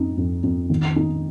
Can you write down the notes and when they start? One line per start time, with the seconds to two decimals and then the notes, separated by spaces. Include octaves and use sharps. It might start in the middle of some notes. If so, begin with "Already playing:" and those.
Already playing: F2 D#4
0.17 F2
0.43 F2
0.70 D#3
0.96 D#4